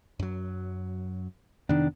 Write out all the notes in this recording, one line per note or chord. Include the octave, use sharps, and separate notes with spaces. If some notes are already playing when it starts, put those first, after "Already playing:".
F#2 F#3
F2 C3 D#3 B3 D4